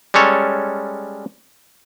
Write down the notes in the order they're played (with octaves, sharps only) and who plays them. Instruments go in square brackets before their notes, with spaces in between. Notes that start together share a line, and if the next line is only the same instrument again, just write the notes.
[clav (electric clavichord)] G3 G#3 C#4 A4 C#5